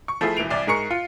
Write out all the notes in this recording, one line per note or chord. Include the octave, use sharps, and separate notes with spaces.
C#6
F3 A3 E4 G#4
E1 E3 D7 F7
C2 D5
G#2 G#4 A#4 C#6 C#7
F4